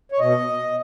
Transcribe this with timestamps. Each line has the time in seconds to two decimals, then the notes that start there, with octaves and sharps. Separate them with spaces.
0.12 C#5
0.20 B2 D#5